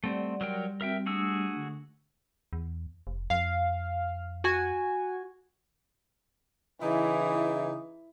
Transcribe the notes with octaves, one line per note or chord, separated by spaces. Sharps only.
G3 A3 C4 D5 F#5 C6
F#3 A#4 G5
C4 F#4 A#4 E5 G5
G#3 A3 D4 F#4 G#4 E6
D3
E2
F1
F2 F5
F#4 G#5
C#3 E3 D#4 E4